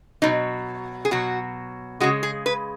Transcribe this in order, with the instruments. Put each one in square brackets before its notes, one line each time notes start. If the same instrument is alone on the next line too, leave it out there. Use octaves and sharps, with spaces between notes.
[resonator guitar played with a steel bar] B2 F#3 D#4
G#4
B2 F#3 F#4
C#3 G#3 F#4
G#4
B4